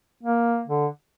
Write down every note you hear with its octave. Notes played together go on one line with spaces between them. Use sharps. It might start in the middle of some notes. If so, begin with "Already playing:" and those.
A#3
D3